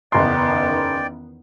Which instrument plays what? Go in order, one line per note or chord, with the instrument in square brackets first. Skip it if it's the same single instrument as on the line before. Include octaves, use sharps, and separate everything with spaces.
[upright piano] F#1 C6 [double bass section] E2 D#3 B3 [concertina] D5 G5